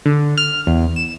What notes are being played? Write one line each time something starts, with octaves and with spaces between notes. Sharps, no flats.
D3
F6
E2
E7